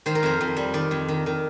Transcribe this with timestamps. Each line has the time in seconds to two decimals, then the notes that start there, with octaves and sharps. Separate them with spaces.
0.06 D#3 C5
0.15 A#4
0.23 F2 C5
0.41 F2
0.56 G3
0.74 D#3 D5
0.91 F2
1.08 D#3
1.26 D#3